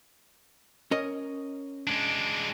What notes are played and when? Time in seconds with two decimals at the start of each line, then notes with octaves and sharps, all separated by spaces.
0.91 C#4 A#4 D#5
1.87 G#3 D4